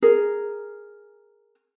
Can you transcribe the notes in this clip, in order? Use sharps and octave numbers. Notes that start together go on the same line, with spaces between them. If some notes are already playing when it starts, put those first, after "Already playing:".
G#4 A#4